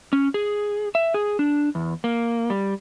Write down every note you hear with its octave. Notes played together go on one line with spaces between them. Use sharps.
C#4
G#4
E5
G#4
D4
E2
A#3
G3